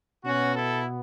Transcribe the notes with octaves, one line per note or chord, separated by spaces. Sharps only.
B2 B3 C#4 F#4
E4 A4